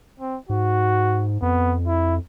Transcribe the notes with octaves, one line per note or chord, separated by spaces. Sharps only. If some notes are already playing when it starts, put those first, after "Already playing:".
C4
G#2 F#4
F2 B3
E4